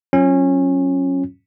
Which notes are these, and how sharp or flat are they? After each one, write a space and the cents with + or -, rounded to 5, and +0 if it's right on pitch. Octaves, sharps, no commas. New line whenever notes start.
F#3 +0 C#4 -20 F4 +0